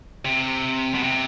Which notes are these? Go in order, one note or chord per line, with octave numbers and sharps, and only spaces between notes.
C3
B2
C3